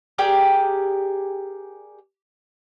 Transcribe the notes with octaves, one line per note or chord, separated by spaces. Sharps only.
G4 G#4 A#4 D5